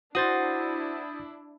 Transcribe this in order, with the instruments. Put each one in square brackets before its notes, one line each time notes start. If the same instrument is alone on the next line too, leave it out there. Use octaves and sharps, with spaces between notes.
[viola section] D4 E4 [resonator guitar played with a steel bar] F#4 C5 [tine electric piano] D#6 G6 A6